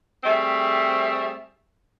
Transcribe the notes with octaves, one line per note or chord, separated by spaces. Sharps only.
G3 A3 C4 G#4 E5